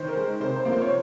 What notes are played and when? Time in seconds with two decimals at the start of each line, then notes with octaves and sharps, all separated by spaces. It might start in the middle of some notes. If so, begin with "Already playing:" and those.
Already playing: D#3 C5
0.08 A#4
0.16 G#3
0.40 C3 C5
0.56 C5
0.65 F3 A#3
0.73 C5
0.81 C#5